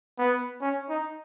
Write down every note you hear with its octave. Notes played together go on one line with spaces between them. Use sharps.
B3
C#4
D#4